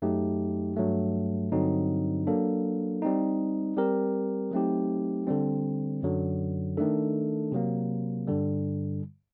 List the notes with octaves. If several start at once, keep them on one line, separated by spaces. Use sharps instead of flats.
F#2 F#3 A3 D#4 G4
G2 F#3 A3
G2 D3 F#3 C4 D#4
F#3 A#3 D4 A4
G3 C4 D#4
G3 C4 G4 A#4
F#3 A3 C4 D#4 G4
D3 G3 C4
F#2 D3 F#3
D#3 A3 D4 A4
C3 F#3 A#3
G2 D3 G3